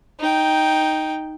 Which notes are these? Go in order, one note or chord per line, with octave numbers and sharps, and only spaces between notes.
D#4 G5